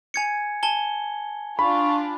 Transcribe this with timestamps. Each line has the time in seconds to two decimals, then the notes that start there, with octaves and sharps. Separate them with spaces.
0.14 G#5 G#6 C#7
0.63 G#5 A5 G7
1.59 D4 F4 B5 C#6